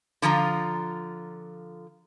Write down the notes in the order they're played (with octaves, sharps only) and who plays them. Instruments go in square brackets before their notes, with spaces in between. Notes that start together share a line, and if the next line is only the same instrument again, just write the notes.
[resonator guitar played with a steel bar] D3 F3 F4 A#5